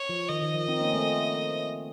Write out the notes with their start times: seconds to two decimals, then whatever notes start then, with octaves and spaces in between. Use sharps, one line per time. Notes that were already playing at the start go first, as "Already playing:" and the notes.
Already playing: C#5
0.09 F3
0.29 D#3 D#5
0.42 D#3
0.54 F3
0.68 C4 D#4
0.81 A#3 C#4
0.93 A3 C4